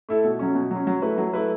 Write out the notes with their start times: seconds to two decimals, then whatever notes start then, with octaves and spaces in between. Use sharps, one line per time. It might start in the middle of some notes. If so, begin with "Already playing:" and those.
0.09 A3 E4 A4
0.24 B2
0.39 F#3 C#4
0.55 B2
0.71 F#3
0.76 C#4
0.87 F#3
1.02 A3 E4 B4
1.18 F#3
1.33 A3 E4 B4